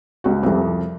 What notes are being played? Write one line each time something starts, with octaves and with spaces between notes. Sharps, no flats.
C#2 F#4
C2 F2